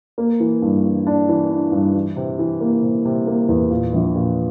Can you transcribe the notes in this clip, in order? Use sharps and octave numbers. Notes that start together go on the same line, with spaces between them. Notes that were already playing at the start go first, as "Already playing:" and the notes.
A#3
E3
G2
E3
D4
E3
D4
G2
E3
C3
E3
A#3
C3
C3
A#3
E2
A#2
A#1
A#2